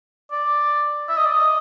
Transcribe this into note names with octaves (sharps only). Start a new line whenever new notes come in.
D5
E5
D#5
D5
D#5